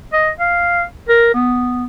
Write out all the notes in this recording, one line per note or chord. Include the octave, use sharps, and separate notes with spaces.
D#5
F5
A#4
B3